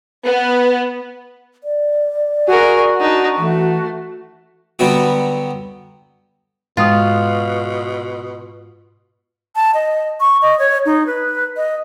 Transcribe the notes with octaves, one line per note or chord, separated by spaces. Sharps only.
B3
D5
F#4 G#4 A#4
D4 D#4
E3 A3
D3 F#3 G3 B3 F#4
G#2 B2 G#3 F4 C6 D#6
A5
D#5
C#6
D#5
C#5
D#4
B4
D#5